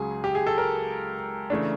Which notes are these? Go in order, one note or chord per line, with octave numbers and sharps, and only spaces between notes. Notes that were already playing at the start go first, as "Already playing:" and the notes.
Already playing: C#2 C#3 F#3 G#4
G4
G#4
A4
A#4
C#3 E3 A3 D4